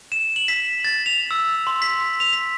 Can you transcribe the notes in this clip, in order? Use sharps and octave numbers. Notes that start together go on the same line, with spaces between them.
E7
F#7
B6
A6
F7
E6
C6
B6
F7
B6